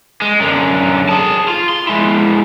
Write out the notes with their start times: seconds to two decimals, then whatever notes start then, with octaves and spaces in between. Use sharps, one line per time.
0.22 G#3
0.40 F#2 D3
1.09 G#4 A5
1.48 F4
1.69 C6
1.87 G#3 E4